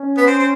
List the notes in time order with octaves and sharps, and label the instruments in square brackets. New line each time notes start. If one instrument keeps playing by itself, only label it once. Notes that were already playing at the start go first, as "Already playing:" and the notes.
Already playing: [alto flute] C#4
[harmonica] B3
C4
C4